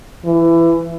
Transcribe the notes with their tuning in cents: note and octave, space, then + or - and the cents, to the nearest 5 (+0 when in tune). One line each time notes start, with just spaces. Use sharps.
E3 +20